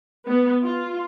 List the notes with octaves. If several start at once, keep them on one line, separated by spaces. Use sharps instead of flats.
B3
F4